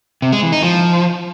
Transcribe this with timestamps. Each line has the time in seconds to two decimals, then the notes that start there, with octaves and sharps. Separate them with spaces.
0.22 C3
0.32 G#3
0.42 E3
0.52 D#4
0.63 F3